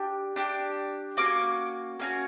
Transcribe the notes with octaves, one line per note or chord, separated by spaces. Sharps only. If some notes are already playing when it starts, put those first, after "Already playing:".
Already playing: D4 G4
D4 G4
A#3 C#4 F#4 D6
A#3 C#4 F#4